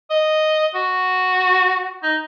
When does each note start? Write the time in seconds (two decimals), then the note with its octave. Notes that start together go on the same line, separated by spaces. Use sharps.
0.10 D#5
0.75 F#4
2.03 D#4